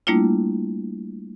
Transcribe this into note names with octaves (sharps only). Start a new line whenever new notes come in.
G3 A3 A#3 D4 E4 F4